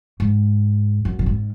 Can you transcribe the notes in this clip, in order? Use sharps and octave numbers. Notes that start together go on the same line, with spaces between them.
G#2
F#2
A#2
G#2